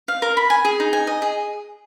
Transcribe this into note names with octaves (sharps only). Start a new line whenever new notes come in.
F5
A#4
B5
G#5
G#4
D#4
G#5
D#5
G#4